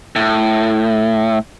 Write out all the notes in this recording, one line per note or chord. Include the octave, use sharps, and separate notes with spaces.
A2